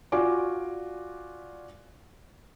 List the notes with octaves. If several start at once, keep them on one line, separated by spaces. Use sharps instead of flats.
F4 F#4 D5 G#5 D6